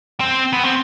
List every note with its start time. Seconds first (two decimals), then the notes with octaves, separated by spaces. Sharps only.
0.20 C4
0.53 B3
0.63 C4